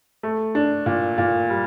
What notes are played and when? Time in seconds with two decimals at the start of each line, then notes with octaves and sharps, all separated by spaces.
0.23 A3
0.55 D4
0.86 A#2
1.18 A#2
1.50 G3